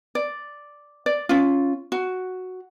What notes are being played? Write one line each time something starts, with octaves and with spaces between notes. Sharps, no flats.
D5
D5
C#4 F4
F#4